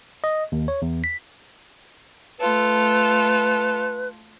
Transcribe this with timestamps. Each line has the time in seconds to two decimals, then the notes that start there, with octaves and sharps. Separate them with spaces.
0.24 D#5
0.52 D#2
0.68 C#5
0.82 E2
1.04 B6
2.39 A3 F4 A4 B4